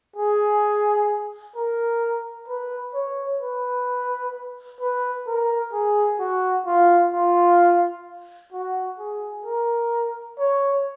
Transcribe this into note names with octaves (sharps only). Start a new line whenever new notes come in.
G#4
A#4
B4
C#5
B4
B4
A#4
G#4
F#4
F4
F4
F#4
G#4
A#4
C#5